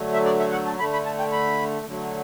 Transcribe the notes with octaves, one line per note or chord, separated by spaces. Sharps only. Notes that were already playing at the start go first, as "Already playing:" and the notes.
Already playing: D3 F#3 A3
E5
D5
E5
F#5
A5
D3 A3 B5
B5
A5
G5
B5
D3 F#3 A3